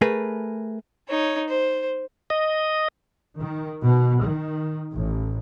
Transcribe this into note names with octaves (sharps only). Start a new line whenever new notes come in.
A3 G#4 A#4 B4
D#4 C#5
C5
D#5
D#3
B2
D#3
A1